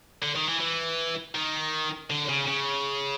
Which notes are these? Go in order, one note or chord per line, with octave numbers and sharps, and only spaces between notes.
D3
D#3
E3
E3
D#3
D3
C#3
C#3